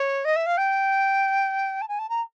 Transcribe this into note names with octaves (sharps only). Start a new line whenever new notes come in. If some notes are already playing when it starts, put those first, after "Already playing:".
Already playing: C#5
D#5
E5
F5
G5
A5
G#5
A5
A#5